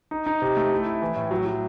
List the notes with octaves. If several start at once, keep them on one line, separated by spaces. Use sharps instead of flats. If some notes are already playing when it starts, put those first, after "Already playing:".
D#4
D#4
C3
A3
E4
E4
E3
A2
F#3
F#3